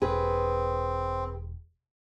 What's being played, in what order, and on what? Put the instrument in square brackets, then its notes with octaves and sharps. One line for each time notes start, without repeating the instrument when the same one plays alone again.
[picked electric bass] E1 [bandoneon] C4 [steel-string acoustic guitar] G#4 B4